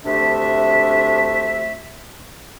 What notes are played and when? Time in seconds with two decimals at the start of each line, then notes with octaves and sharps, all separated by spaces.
0.04 D2 C3 A3 D4 E5